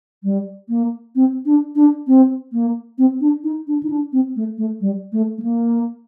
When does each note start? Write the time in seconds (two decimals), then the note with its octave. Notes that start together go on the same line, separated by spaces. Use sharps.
0.23 G3
0.69 A#3
1.15 C4
1.45 D4
1.75 D4
2.07 C4
2.52 A#3
2.98 C4
3.21 D4
3.44 D#4
3.67 D4
3.83 D#4
3.90 D4
4.12 C4
4.36 A3
4.58 A3
4.81 G3
5.12 A3
5.38 A3
5.42 A#3